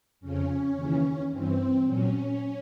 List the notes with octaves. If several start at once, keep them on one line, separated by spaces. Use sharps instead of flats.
F2 C#3 F3 C#4
D#2 C#3 E3
G2 E3 C4
A#2 F#3 C#4